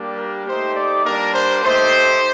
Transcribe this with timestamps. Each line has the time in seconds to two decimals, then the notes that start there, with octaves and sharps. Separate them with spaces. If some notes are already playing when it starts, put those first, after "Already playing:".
Already playing: G3 A#3 D4 G4
0.17 A#4
0.46 A3 D#4 G4 C5
0.75 D5
1.05 G3 A#3 D4 A#4
1.34 C5
1.63 A3 D#4 G4 C5